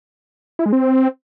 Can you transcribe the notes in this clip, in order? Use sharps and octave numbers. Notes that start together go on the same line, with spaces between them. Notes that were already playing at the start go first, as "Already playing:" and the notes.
E4
G#3
C4